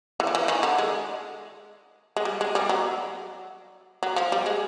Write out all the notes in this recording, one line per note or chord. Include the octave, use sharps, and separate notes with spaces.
E3
F3
E3
D#3
D3
G#3
G#3
G3
G#3
G3
F#3
F#3
F3
G3
G#3